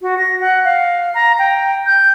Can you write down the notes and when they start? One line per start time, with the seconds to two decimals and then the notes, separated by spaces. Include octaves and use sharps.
0.02 F#4
0.18 A#6
0.41 F#5
0.65 F5
1.14 A#5
1.39 G5
1.86 G6